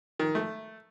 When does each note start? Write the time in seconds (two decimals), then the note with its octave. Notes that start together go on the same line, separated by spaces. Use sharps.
0.19 D#3
0.35 A3